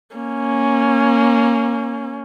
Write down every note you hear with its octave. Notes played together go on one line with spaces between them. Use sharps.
A#3 C#4